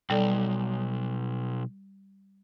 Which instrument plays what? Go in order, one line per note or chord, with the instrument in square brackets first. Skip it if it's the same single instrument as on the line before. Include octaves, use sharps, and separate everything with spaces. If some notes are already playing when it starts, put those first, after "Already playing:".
[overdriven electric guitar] B1 [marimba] G3 A4 D5